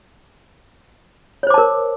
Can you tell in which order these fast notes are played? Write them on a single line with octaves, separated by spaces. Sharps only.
C#5 C5 D6 A5 A#4